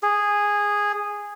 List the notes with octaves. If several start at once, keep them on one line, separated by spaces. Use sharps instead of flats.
G#4